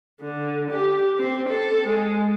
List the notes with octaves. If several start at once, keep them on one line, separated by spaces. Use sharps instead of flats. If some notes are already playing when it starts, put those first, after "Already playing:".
D3
G4
C4
A4
G#3